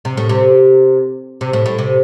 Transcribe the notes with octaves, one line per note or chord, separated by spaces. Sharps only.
C3
A2
C3
C3
A2
A2
C3